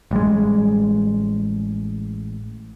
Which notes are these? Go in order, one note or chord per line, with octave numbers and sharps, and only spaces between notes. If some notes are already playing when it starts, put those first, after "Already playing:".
A1 G3 G#3